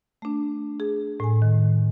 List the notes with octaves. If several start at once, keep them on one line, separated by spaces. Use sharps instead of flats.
A3 D4
G#4
A2 G#5
D#3